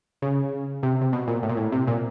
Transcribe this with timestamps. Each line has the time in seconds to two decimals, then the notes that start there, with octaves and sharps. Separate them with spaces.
0.22 C#3
0.83 C3
1.01 C3
1.13 B2
1.28 A#2
1.43 A2
1.49 A#2
1.57 A2
1.72 C3
1.87 A#2